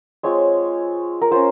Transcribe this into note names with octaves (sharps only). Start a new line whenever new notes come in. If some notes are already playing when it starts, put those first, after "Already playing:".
G#3 C4 F4 C#5
A#4
C#4 F4 C5